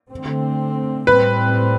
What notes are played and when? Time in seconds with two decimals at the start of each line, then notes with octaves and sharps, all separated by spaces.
0.12 D3 A3 C4
1.07 A2 G3 C4 B4